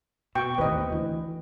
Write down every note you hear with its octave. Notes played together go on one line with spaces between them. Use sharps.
B2 G5 C#6
A1 D#2 C4 B4 D#5
D2 E3